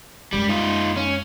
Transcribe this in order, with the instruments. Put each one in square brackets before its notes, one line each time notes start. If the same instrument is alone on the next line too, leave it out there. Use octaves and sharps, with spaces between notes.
[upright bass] F#2 G#3 [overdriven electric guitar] G3
[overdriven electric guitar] D#4 F4
C#4